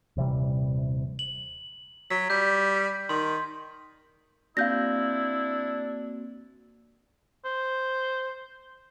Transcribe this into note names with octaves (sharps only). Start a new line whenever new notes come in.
D#1 C3 E3 G3
F#7
F#3 B6
G3 G6
D#3 C6
A#3 C4 D4 E4 F#4 F5 G6 A#6
C5